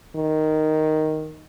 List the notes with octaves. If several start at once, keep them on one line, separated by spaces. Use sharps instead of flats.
D#3